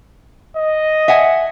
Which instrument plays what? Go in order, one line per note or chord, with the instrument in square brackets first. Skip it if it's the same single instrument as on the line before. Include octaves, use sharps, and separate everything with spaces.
[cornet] D#5
[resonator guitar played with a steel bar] E5 F#5 G#5